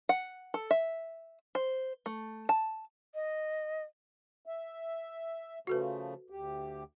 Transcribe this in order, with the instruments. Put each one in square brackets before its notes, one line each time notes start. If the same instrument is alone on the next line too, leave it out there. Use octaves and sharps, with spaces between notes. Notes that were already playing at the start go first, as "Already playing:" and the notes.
[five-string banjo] F#5
A4
E5
C5
A3
A5
[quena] D#5
[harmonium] E5
[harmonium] C#3 F3 A3 [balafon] F#4 A4 B4
[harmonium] D2 G4